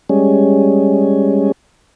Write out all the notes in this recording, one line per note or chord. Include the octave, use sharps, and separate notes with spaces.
G3 G#3 C#4